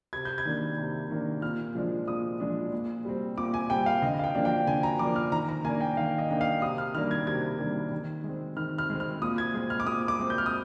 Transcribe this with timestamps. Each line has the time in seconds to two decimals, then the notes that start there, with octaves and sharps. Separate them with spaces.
0.13 C3 G#6
0.25 G6
0.38 G#6
0.45 D#3 A#3 D4
0.77 C3
1.10 D#3 A#3 D4
1.42 A#2 F6
1.75 F3 G#3 D4
2.07 A#2 D#6
2.40 F3 G#3 D4
2.72 A#2
3.05 G3 C4
3.38 A#2 D6
3.54 G#5
3.70 G3 C4 G5
3.86 F5
4.02 D3 D#5
4.19 F5
4.24 G5
4.35 F3 A#3 D4
4.45 G5
4.67 D3 G#5
4.83 A#5
4.99 F3 A#3 D4 D6
5.16 F6
5.32 D#3 A#5
5.49 A#5
5.64 A#3 G#5
5.69 D4
5.81 G5
5.97 D#3 F5
6.18 D#5
6.30 A#3 D4 G5
6.41 F5
6.62 C3 D#6
6.78 F6
6.94 D#3 G3 A#3 D4 F6
7.11 G#6
7.27 C3 G#6
7.59 D#3 G3 A#3 D4
7.92 D#3
8.24 G#3 C4
8.57 D#3 F6
8.78 F6
8.90 G#3 C4
9.00 F6
9.22 A#2 D#6
9.38 G#6
9.54 G#3 C4
9.70 F6
9.80 D6
9.87 A#2 D#6
10.08 D6
10.19 G#3 C4
10.30 G6
10.38 F6
10.46 D#6